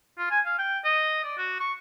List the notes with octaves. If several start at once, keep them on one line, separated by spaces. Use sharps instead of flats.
F4
G#5
F5
G5
D#5
D5
F#4
C#6